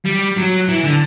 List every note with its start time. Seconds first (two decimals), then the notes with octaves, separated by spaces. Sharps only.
0.05 G3
0.37 F#3
0.68 E3
0.83 D3